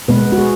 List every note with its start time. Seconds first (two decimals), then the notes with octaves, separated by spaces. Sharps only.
0.08 B2 G#3 B3 B4
0.32 F#4
0.38 G#4